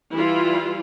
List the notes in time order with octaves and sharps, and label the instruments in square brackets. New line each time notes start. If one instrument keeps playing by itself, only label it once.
[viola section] E3 G3 E4 F4